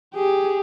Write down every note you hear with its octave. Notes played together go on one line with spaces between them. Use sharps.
G4 G#4